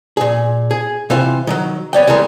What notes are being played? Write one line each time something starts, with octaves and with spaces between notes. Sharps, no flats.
A#2 G#4
G#4
C3 E3 F4 C5 F5
D#3 F3 F#3
B3 C#5 D5 G5
E3 G3 G#3 G#4 A#4